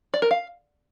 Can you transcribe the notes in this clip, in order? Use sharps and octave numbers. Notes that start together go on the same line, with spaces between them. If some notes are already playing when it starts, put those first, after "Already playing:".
D5
A#4
F5